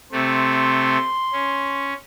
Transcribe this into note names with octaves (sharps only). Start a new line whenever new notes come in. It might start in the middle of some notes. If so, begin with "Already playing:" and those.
C3 A3 C6
C#4